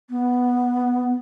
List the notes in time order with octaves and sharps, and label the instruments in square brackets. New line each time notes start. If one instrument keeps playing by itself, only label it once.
[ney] B3